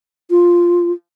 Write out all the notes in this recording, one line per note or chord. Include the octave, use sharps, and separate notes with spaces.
F4